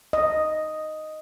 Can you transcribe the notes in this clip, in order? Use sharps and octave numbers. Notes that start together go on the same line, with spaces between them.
D#5